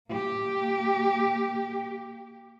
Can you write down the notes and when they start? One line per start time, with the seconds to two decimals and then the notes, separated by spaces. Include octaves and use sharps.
0.10 A#3 G4